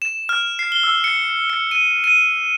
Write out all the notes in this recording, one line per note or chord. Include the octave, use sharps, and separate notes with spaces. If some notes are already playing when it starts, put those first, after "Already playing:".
E7
F6
C7
G7
E6
C#7
C#7
D#7
D#7